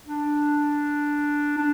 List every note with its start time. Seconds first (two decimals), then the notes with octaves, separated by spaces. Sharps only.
0.06 D4
1.58 D4